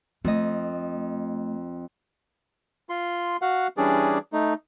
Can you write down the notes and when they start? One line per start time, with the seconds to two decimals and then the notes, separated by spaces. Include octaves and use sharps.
0.25 F2 A3 D#5
2.89 F4 C6
3.42 F#4 F5 F#5
3.77 E3 G3 C#4 D4 G#4 D5
4.33 A3 D#4